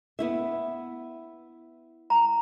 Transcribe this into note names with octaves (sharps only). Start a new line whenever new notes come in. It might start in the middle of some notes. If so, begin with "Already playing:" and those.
B3 E4 E5
A#5